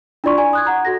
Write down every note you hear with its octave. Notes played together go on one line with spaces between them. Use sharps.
D4 E4 F4 D5 C6 C#6
D5 G#5 A#5
D#6 F#6 G#6
F#5 A#5
F#4 A4 A#6